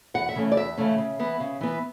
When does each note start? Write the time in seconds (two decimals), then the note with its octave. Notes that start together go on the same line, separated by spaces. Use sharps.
0.14 E2 F#5
0.29 E5
0.35 C#3 E3 A3 C#4
0.52 D5
0.57 E2 E5
0.77 C#3 E3 A3 C#4
0.98 C#3
1.19 E3 B3
1.40 C#3
1.61 E3 B3